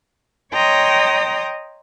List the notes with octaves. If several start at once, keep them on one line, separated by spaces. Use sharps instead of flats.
C#5 D#5 G5 A#5 C6 D#6